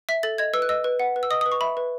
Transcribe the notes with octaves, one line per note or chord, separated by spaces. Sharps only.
E5 B6
A4 A6
D#5 G#6
B4 E6
F#6
D#5 E6
B4
F#5
B4
E6
D#5 D#6
D#6
B4
C#6
E5 B5
B4